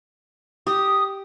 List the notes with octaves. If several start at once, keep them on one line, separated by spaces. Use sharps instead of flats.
G4 D#6